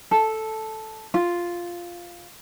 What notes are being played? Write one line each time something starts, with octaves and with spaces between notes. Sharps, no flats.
A4
F4